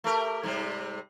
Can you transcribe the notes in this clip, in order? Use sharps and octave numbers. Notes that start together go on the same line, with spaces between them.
A3 G4 A#4
G#2 C3 G3